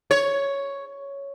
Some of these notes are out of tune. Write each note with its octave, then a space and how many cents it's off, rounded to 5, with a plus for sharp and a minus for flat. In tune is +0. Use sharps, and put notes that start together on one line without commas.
C#5 +5